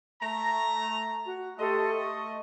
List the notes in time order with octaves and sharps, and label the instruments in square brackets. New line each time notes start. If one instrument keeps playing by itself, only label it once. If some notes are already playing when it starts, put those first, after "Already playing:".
[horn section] A3 A#5
[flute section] F#4
[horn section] A3 D#5 [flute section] G4 A4 C6
[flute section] C#6